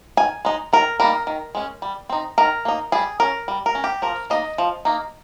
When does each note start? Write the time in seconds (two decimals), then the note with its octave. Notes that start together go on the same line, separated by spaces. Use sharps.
0.17 D#3 G#5
0.45 G#3 D#4
0.73 D#3 A#4
1.00 G3 A#3 D#4 A#4
1.27 D#3
1.55 G#3 C#4
1.82 G3
2.09 C4 D#4
2.38 D#3 A#4
2.65 A#3 D#4
2.92 G3 G#4
3.20 C#4 A#4
3.48 G3
3.66 A#4
3.75 C#4
3.84 G4
4.02 F3 A#4
4.30 A#3 D#4 D#5
4.58 F3
4.85 A#3 D#4